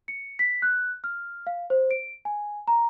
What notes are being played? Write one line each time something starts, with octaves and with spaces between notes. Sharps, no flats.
C#7
B6
F#6
F6
F5
C5
D7
G#5
A#5